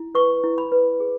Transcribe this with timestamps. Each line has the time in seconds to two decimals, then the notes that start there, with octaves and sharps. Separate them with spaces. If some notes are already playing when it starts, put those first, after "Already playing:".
Already playing: E4
0.15 B4 C#6
0.44 E4
0.58 B5
0.72 B4
1.00 G#4